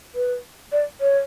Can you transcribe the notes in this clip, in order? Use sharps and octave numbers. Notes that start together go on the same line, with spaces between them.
B4
D5
C#5